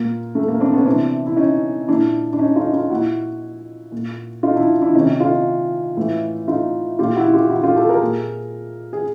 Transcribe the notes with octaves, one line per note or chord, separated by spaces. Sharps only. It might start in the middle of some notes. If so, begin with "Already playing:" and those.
Already playing: A#2 A#3
A3
A#3
C4 D4
B3 C#4
C3 E3 C4 D4
E4
C#4 D#4
A#2 D4 E4
D4
C#4 D#4
D#4 F4
D#4 F4
A#2 E4 F#4
A#2
D#4 F4
D4 E4
D4 E4
C3 D#3 C#4 D#4
D#4 F4
A2 E3
D#4 F4
A#2 F4 G4
E4 F#4
F4 G4
E4 F#4
F4 G4
G4 A4
G#4 A#4
A#2
G#4